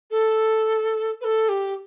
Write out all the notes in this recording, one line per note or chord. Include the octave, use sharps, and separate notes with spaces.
A4
B4
A4
G4